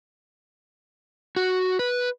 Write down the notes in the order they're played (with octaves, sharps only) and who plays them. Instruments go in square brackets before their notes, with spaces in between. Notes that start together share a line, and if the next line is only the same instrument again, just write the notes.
[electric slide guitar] F#4
B4